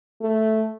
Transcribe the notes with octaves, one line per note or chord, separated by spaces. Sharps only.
A3